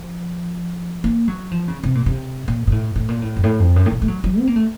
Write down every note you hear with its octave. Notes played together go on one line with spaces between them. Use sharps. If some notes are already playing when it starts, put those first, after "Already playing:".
Already playing: F3
A#3
F#3
F3
C#3
C3
A#2
C3
A#2
A#2
A2
A2
A#2
A2
F#2
A2
F2
F#2
A2
A#2
A3
F#3
F#3
C4
A#3
A3